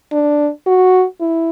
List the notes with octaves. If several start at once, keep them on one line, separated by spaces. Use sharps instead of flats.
D4
F#4
E4